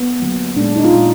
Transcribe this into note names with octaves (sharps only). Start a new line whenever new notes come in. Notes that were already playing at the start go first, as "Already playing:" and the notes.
Already playing: B3
D3 F#3 A#3
A#2 G#3 D4
D#4
F4
A#2 G#3